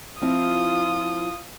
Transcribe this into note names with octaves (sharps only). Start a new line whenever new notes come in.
F3 C4 E4 F4 D#6